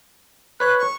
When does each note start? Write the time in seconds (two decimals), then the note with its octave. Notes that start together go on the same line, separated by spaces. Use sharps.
0.60 B4 C#5 F#6
0.79 C#6